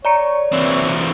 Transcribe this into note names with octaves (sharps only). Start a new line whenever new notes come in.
C#5 D5 A#5 C#7
E3 C4